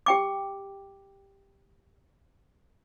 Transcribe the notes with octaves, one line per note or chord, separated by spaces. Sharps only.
G4 G5 D6